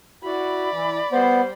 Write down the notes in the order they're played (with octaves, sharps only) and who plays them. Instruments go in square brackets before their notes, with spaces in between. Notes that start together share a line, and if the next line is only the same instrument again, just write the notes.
[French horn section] E4 F#4 [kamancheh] D5 B5
[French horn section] E3
[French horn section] G3 C5 [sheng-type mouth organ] B3